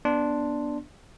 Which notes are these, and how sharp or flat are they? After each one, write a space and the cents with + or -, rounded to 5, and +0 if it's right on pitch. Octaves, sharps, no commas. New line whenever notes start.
B3 -15 D4 +0 C6 +0